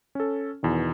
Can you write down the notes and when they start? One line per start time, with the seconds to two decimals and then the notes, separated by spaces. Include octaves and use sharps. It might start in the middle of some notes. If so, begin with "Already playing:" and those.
0.15 C#4 A4
0.63 E2 B2 D#3